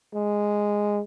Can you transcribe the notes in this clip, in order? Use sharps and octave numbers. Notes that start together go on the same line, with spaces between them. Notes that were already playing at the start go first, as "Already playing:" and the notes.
G#3